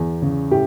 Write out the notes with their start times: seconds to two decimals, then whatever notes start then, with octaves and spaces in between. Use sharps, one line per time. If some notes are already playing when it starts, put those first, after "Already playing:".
Already playing: E2
0.22 C#3
0.51 A2 G4